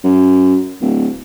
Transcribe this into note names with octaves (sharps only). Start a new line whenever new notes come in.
F#2
D1